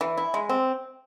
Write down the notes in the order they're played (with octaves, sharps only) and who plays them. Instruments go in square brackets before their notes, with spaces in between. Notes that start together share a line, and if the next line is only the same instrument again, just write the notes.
[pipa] E3
E4
G#3
C4